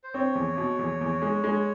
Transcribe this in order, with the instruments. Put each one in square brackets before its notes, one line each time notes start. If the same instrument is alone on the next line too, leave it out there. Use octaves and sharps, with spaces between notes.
[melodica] C5
[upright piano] C4 [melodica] C#5
[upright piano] E2
B2
E2
E2
G#3
G#3